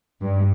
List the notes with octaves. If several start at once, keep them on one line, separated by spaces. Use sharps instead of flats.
G2